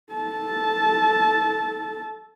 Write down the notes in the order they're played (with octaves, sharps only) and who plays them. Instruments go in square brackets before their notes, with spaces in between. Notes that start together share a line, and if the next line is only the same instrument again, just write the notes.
[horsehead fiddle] A4 A5